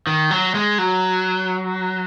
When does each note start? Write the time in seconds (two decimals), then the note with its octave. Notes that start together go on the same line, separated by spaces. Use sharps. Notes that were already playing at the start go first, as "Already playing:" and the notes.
0.07 D#3
0.31 F#3
0.55 G#3
0.78 F#3